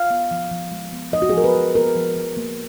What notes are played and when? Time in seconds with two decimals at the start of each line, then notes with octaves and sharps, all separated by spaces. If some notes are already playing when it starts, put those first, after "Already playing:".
Already playing: F5
0.10 B3
0.31 F3
0.51 F3
0.71 G#3
0.93 B3
1.13 F3 D#5
1.22 F#4
1.30 G#4
1.34 F3 A#4
1.44 B4
1.55 G#3
1.75 B3 A#4
1.96 F3
2.16 F3
2.37 A#3